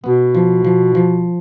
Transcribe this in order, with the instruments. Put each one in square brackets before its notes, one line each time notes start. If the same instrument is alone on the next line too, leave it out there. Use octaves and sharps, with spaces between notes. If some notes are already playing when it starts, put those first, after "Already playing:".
[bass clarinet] B2 [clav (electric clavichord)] B3
[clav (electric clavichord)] F3
F3
F3